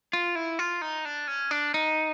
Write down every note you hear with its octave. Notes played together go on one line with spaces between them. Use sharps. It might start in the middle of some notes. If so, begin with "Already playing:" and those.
F4
E4
F4
D#4
D4
C#4
D4
D#4